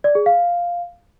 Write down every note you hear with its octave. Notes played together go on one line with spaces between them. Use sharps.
D5
G#4
F5